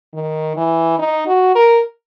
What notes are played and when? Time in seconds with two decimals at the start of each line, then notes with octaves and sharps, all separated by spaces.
0.14 D#3
0.57 E3
0.99 D#4
1.27 F#4
1.55 A#4